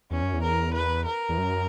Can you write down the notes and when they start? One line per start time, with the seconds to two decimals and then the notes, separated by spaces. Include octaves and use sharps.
0.11 E2 C#4
0.22 F#2
0.33 E2
0.42 A#4
0.74 B4
1.05 A#4
1.29 E2
1.38 F#2